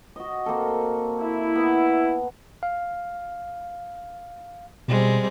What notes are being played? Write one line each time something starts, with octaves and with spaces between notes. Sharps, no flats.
F#4 D#5
A#3 C4 A4
E4
B3
F5
B2 G3 G#3 C4